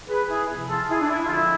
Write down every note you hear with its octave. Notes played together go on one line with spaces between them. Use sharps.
G#4 B4
E4 G#4
E2 C3 F3
F4 A4
E4 G#4
D4
E4
F4
F2 D3 F3 G#3 E4